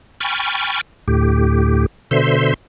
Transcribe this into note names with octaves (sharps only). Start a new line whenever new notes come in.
G5 G#5 B5 C#6 F6 A6
D2 A2 G4
B2 D3 C5 E5 C6